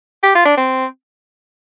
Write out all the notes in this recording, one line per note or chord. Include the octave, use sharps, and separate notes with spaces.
G4
F4
D4
C4